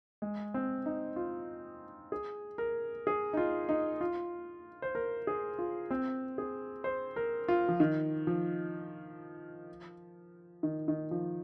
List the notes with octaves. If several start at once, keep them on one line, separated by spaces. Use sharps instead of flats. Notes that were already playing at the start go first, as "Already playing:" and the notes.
G#3
C4
D#4
F4
G#4
A#4
G#4
D#4
F4
D#4
F4
C5
A#4
G#4
F4
C4
G#4
C5
A#4
F4
F3
D#3
F3
D#3
D#3
F3